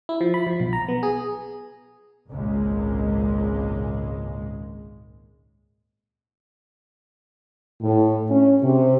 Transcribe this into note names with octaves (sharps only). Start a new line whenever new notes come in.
E4
F3
B5
F3
B1
A#5
B3
G#4
G#1 C#2 A#2 G#3
A2
C#4
C3